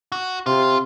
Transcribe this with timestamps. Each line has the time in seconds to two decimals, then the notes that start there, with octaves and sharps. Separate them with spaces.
0.12 F#4
0.46 C3 F4